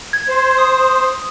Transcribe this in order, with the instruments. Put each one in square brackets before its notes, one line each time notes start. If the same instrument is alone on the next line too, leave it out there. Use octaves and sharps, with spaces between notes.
[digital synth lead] G#6
[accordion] C5
[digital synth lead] D#6